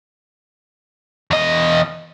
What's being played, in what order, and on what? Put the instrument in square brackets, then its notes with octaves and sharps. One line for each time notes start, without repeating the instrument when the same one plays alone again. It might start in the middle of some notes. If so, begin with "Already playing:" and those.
[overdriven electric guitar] E2 D#5